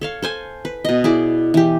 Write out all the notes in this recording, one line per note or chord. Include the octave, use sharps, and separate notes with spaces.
A4 C#5 F5
A4 C5 G#5
B4
B2 D#5
E4 G#4 D5
E3 G4